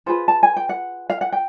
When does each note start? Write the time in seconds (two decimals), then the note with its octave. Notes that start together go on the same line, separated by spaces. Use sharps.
0.06 F4 G#4 B4 C5
0.28 A5
0.43 G#5
0.56 G5
0.69 F#5
1.10 F5
1.21 F#5
1.33 G5